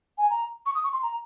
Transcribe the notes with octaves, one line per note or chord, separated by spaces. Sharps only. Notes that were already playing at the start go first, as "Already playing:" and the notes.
G#5
A#5
C#6
D#6
C#6
C6
A#5